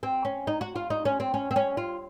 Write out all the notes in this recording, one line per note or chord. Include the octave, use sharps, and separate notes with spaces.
C4
C#4
D#4
F#4
F4
D#4
C#4
C4
C#4
C4
C#4
F4